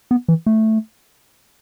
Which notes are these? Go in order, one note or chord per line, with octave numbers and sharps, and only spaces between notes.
B3
E3
A3